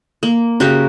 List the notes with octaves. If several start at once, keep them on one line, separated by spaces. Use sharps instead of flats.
A#3
C#3 F#4 G4 A#4